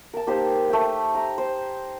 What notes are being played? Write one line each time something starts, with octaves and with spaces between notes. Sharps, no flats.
A#4 A5
A#3 D#4 G4 C5
A3 G5
A#5
C5